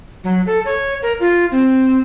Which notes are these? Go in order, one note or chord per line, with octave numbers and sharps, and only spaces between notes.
F#3
A4
C#5
A#4
F4
C4